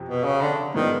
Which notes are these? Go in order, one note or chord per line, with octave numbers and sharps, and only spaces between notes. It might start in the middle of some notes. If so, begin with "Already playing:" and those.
Already playing: F2 C3 F3
B2
C#3
D3
G#2 D#3 F3 G#3 B3 D4